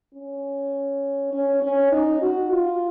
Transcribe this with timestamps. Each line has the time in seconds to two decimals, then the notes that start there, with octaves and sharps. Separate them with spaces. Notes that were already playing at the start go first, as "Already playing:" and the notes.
0.15 C#4
1.33 C#4
1.62 C#4
1.92 D#4
2.22 F#4
2.52 F4